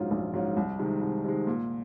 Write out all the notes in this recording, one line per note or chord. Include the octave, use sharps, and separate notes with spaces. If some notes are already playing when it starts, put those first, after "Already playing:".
Already playing: A#1 G#2 F#3 C#4 F4
A#1
G#2 F#3 C#4 F4
C2
C3 D#3 G#3
C2
C3 D#3 G#3
A#2